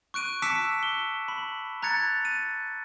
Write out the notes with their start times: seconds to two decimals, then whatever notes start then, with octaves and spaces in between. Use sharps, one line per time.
0.14 C#6 F#6 D7 D#7
0.42 A5 D6 E6 B6 C#7 E7
0.83 G7
1.28 B5
1.82 A#5 F#6 G#6 A6 C#7
2.25 D#7